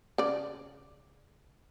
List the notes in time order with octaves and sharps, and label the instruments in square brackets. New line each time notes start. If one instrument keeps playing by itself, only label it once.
[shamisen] C#3 D5